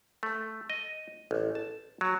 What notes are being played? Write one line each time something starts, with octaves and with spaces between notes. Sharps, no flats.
A3
D#5
A1
A5
F#3